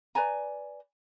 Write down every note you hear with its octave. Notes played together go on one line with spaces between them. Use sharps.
B4 D5 G#5 A#5